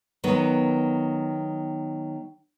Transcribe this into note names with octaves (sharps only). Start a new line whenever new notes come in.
D#3 F#3 B3